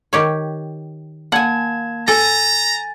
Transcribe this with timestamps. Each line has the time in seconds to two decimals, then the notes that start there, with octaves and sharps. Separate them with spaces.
0.13 D#3 G4 C#5
1.32 A#3 F#5 G#5 A5 G#6
2.08 A4 G#5 A#5 A6